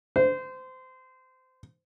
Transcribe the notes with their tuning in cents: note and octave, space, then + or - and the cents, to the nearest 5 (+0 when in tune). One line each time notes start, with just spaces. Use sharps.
C5 -25